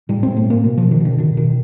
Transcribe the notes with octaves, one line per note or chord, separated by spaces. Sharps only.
A2 G3
C4
A2
A3
A2 A#3
B2
F3
B2
D#3
B2 D3
B2 D#3
B2 D#3